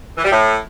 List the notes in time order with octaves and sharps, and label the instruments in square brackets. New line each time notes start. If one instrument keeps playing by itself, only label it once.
[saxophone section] E3
G3
A2